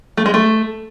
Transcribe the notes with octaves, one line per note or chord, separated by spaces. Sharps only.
A3
G#3
A3